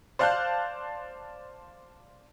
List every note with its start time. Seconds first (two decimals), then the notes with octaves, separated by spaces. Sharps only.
0.19 C5 D5 F5 A5 F#6 G6